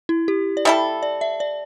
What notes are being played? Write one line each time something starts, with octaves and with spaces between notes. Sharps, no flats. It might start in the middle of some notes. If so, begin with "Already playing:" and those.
E4
G4
D5
G3 E4 A4 E5
D5
E5
D5